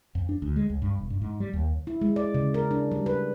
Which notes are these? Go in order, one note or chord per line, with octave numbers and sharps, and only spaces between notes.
F2
D4
D2
G#3
C#2
G2
E1
G2
G#2
G3
D#2
E4
G#3
D5
C#3
A#4
D4
G3
B4